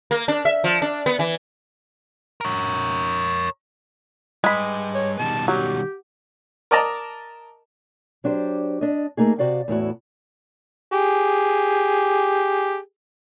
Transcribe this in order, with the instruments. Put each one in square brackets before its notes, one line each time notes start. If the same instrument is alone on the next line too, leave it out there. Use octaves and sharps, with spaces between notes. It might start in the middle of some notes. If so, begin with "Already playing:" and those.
[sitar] A#3
D4
E5
F3
D4
B3
E3
[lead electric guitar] A#4 C#5
[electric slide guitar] G3 B4 [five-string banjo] G#3 B5
[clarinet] C#5
[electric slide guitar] B2 D#3 G3 [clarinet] A5
[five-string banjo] F#3 [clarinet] G4
[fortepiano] A#4 D5 D#5 A5 A#5
[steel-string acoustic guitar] F#3 D4 G4 C5
D4 D#5
A3 A#3 D#4 G#4
C3 F#4 D5 F5 G5
E2 A2 E4 F#4
[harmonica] G4 G#4